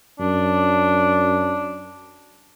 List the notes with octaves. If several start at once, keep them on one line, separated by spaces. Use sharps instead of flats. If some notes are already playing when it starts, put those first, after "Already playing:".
F#2 D4